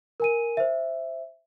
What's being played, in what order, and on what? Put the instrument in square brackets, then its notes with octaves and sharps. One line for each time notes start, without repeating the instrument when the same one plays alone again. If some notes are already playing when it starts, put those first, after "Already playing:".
[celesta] A#4 G#5 D#7
C5 E5